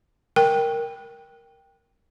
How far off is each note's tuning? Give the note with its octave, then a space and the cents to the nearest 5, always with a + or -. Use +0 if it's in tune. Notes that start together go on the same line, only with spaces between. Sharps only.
A#4 +0 G5 +0